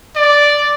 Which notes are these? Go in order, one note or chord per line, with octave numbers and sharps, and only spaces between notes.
D5